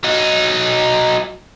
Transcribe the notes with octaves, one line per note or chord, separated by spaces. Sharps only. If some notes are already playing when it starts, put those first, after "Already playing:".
F#3 D#4